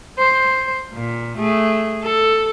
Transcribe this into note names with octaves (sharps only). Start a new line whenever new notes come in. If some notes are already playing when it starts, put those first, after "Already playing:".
C5
A#2
A3 G#4
A4